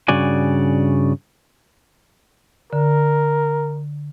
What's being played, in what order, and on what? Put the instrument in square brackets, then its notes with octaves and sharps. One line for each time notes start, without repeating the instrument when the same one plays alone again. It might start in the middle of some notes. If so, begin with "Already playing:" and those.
[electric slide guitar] G2 C#3 F#4 D5 G#5
[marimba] D3 [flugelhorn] A#4